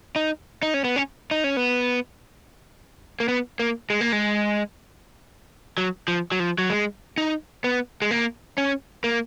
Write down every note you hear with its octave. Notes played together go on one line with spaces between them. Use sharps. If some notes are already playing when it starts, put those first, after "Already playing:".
D#4
D#4
C#4
B3
C#4
D#4
C#4
B3
A#3
B3
A#3
G#3
A#3
G#3
F#3
F3
F#3
F3
F#3
G#3
D#4
B3
G#3
A#3
C#4
A#3